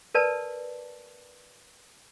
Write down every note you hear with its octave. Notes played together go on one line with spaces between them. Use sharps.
A#4 B4 D5 A5